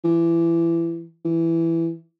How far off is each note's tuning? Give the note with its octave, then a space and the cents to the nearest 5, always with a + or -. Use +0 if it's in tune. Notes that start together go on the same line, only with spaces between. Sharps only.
E3 +25
E3 +5